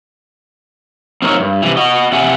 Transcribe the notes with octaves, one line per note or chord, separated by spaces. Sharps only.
C4 D#4 A#4 C#5 E5
G2
C3 E3
F#4 D#5
C3 E5 F#5 G#5